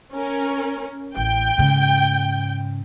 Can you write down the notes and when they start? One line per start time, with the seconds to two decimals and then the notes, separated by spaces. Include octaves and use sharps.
0.12 C#4 A#4
1.17 A1 G5
1.58 G#2 C#3